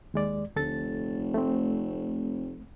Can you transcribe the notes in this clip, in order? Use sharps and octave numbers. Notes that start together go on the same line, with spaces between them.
D#2 G#3 D5
F1 D2 A4 A6
A3 C4